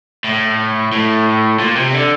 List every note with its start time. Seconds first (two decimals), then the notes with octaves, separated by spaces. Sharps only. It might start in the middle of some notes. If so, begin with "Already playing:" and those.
0.24 A2
0.92 A2
1.59 A#2
1.76 C3
1.93 D3